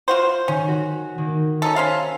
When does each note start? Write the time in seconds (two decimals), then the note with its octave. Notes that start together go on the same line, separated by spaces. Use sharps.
0.08 F4 F#4 C5
0.48 D#3 C#4
0.68 F#4
1.18 D#3 A#3
1.62 C#4 D#4 A4
1.76 C#4 C5 F5